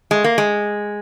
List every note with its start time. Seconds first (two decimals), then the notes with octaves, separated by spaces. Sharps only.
0.11 G#3
0.24 A#3
0.38 G#3